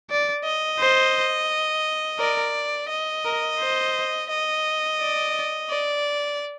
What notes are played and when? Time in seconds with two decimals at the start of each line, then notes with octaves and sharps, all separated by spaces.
0.10 D5
0.44 D#5
0.79 C5
2.19 A#4 D5
2.89 D#5
3.25 A#4
3.60 C5
4.29 D#5
4.99 D5
5.69 D5